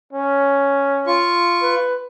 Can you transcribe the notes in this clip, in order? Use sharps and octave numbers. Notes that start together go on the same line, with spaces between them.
C#4
F4 C#6
B4